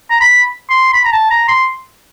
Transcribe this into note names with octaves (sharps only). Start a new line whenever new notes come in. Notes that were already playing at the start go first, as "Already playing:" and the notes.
A#5
B5
C6
B5
A#5
A5
A#5
C6